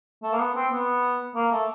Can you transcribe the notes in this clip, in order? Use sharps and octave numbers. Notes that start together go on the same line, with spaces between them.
A3
A#3
B3
C4
B3
A#3
A3